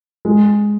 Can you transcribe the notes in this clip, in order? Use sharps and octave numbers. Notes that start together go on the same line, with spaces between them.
G#3